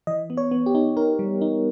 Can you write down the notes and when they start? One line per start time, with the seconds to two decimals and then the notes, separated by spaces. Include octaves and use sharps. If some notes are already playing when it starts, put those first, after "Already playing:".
0.07 E3 D#5
0.30 B3
0.37 C#5
0.51 B3
0.66 G4
0.75 D#4
0.97 D#4 A#4
1.19 G3
1.41 D#4